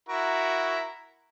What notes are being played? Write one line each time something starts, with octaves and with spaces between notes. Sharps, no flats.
E4 F#4 A#4